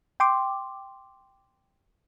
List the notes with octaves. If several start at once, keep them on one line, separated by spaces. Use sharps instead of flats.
G5 C6 D6